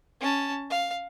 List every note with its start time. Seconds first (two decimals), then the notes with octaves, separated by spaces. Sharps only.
0.21 C#4 A5
0.70 F5